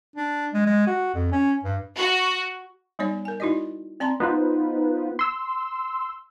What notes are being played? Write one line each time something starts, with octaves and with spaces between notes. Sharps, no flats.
D4
G#3
G#3
F#4
F2
C#4
G2
F#4
G3 B3 D#4 C#5 D5
A#4 G#5
D#4 E4 F#4 D5 D#5
C4 D5 A5 A#5 C6
B3 D#4 F4 B4 C5
C6 E6